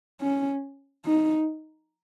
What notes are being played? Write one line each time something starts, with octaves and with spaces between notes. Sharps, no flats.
C#4
D#4